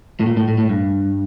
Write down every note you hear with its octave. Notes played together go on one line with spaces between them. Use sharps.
A2
A#2
A2
A2
A2
G2